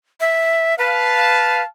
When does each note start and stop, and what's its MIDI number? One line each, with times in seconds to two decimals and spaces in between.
0.20 0.75 76
0.78 1.63 71
0.78 1.65 77
0.78 1.65 81